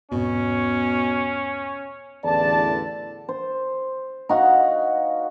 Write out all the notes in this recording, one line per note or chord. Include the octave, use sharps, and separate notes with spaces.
E1 G#2 B2 C4 C#4
A1 E2 D3 D5 A5
C5
D#4 F#4 F5 F#5